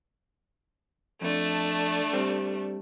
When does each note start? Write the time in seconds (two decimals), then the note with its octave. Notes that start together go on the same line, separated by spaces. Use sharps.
1.21 F2 A3 D4
2.13 G3 C4